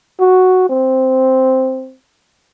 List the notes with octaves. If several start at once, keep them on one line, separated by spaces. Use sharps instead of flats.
F#4
C4